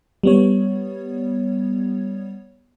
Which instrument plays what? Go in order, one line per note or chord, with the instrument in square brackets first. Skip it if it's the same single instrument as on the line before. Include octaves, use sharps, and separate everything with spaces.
[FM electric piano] G3 B3 C#5